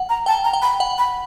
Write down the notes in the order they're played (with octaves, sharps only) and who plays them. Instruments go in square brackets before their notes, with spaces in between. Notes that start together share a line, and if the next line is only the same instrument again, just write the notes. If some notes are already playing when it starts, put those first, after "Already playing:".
Already playing: [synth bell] F#5
[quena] A#5
[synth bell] G5 [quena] A5
[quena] A#5
[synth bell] G5
[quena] B5
[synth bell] F#5
[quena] B5